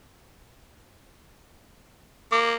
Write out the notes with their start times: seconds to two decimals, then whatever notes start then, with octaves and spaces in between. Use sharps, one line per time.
2.32 A#3 D6